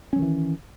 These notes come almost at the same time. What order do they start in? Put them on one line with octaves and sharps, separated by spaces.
C#4 F#3 D#3 E3